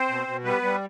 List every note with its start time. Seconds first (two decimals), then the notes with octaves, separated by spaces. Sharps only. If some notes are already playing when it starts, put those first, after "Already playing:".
Already playing: C4 C5
0.09 B2
0.27 B2
0.44 G3 B3 B4
0.62 G3